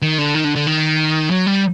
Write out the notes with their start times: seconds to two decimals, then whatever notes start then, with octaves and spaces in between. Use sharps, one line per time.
0.02 D#3
0.18 D3
0.35 D#3
0.44 D3
0.56 D3
0.67 D#3
1.31 F#3
1.46 G3